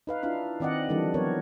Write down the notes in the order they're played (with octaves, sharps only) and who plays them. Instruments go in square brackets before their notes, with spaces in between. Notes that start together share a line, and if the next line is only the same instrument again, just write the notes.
[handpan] D#4 B4 F5
D4 E4 F4 F5
D#3 C4 D5 D#5 F#5
D3 E3 F3 G3 D4
F#3 B3 A#4 C#5